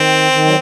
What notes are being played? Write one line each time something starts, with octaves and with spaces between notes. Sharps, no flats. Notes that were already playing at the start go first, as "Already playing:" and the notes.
Already playing: D#3 C4
D#3
F#3